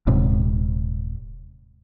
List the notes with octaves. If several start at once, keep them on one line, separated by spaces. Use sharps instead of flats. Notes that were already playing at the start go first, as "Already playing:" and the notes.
D#1 G#2 C3